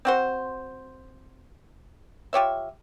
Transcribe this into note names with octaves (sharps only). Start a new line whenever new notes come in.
C4 F#4 C5
F4 G4 C#5 E5